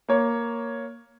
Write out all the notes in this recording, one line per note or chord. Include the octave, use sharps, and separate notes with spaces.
A#3 C#5